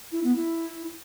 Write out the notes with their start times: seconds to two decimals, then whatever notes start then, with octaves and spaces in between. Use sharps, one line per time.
0.12 E4
0.24 B3
0.36 E4